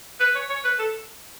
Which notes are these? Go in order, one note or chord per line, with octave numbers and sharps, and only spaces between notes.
B4
C#5
C#5
B4
A4